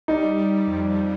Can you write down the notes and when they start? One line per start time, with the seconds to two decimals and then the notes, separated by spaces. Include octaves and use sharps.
0.08 G3 D#4
0.38 G3
0.67 F2
0.96 G3